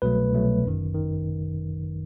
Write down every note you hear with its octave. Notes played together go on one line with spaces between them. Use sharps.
C2 B2 F#3 A3 B4
C2 B2 F#3 A3
G1 F#2 D#3
D#3